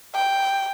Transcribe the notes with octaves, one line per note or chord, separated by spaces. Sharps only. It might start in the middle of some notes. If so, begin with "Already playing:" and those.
G5